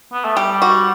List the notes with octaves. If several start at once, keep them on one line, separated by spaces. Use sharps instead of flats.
B3
A3
G3 G4
F#4